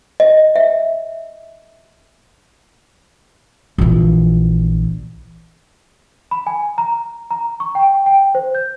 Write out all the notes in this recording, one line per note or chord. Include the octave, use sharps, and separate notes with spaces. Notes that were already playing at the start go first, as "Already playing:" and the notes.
D#5
E5
A#1 E3
B5
G#5
A#5
A#5
C#6
G5
G5
C5
G6